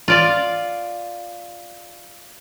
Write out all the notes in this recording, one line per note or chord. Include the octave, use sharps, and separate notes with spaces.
F4 D5 F5